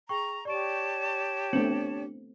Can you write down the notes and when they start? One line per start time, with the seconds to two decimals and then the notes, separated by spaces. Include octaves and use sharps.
0.09 G#4 G5 A#5 C#6
0.45 G4 C#5 D5 A5 C#6 D7
1.53 A3 B3 C4 D4 C#7 F#7